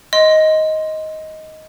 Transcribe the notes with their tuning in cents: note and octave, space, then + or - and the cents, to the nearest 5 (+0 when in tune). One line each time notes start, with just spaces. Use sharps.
D#5 +10 C6 +0